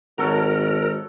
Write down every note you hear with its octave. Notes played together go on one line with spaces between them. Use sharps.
G#1 F#3 A4 A#4 C#5